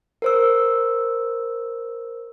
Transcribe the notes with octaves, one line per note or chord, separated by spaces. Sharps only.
A#4 C5 E6